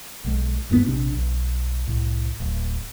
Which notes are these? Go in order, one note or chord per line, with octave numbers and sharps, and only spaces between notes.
B1 G#3
D#1 G2 C3 B3
A#1 C3 D4
B1
C2 A2
D1